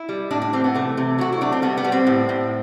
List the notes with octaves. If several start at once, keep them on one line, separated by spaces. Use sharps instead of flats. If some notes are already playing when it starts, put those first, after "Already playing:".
Already playing: E4
G3
A2 D4
D4
E3 C4
B3
C3 A3
C3
F#3 F#4
E4
A3 D4
C4
G3 B3
B3
G3
C4
A2
A2